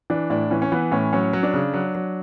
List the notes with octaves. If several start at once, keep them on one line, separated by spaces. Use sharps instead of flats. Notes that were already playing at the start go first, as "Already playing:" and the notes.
E3 D4
A2 D4
E3 C#4
C#4
E3 B3
A2 C#4
F#3 C#4
F#3
D4
C#3
F#3
F#3